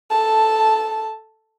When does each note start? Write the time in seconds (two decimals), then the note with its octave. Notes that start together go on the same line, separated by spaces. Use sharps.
0.10 A4 A5